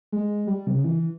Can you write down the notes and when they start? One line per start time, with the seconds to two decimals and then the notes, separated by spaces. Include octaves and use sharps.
0.12 G#3
0.47 G3
0.67 C3
0.74 C#3
0.84 E3